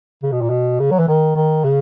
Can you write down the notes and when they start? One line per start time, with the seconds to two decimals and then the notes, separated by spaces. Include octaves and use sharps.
0.23 C#3
0.32 B2
0.41 A#2
0.50 B2
0.80 C#3
0.91 F#3
0.99 E3
1.08 D#3
1.36 D#3
1.64 C#3